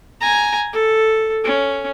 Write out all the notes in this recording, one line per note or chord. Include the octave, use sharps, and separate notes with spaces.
G#5 A#5
A4
C#4